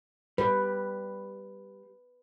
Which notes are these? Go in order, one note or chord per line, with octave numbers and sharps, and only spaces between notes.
G3 B4